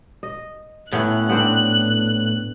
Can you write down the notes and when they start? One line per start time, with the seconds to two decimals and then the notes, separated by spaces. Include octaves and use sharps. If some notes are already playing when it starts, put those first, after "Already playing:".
0.23 D#5
0.92 A2 B3 C#4 E4 F#6
1.29 B3 C4 D4